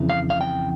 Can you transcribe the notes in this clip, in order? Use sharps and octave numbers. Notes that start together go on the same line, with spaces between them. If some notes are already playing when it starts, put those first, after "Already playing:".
Already playing: F2 C#3 E3
F5
F5
G5